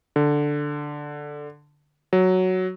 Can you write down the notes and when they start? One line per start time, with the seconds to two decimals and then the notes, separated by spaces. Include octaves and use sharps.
0.16 D3
2.13 F#3